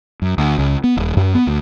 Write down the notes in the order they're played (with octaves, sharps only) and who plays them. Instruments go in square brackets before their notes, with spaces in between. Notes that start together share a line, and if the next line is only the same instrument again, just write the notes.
[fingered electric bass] F#2
D2
C#2
B3
D#1
F#2
B3
D2